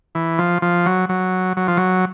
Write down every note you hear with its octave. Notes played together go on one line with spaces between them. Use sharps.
E3
F3
F3
F#3
F#3
F#3
F3
F#3